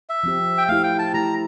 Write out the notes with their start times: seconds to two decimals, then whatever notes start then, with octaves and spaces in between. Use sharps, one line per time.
0.09 E5
0.23 F3 C4 G4
0.58 G5
0.69 A3 E4 G4 F5
0.84 G5
0.99 A5
1.14 A3 E4 G4 A#5